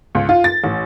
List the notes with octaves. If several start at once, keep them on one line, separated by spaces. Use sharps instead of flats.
C#2
F4
A6
A1